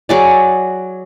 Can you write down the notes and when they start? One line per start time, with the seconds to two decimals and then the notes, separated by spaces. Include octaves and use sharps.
0.09 F#3 G#4 D5